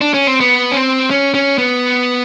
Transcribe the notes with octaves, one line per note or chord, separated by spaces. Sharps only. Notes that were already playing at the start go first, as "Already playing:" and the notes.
D4
C#4
C4
B3
C#4
C4
C#4
C#4
B3